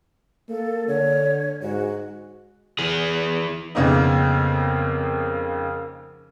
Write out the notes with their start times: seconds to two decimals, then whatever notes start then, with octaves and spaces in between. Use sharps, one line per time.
0.49 A#3 A4
0.88 D3 C#5
1.62 G#2 F#4
2.79 E3 G#4
3.75 F2 C#3 A#3 B3 D#4